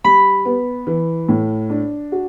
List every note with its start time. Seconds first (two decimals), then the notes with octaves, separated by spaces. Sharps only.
0.04 G3 B5
0.45 B3
0.87 E3
1.29 A2
1.70 D4
2.12 F#4